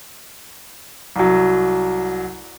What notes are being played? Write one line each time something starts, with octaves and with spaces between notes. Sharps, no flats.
C2 F#3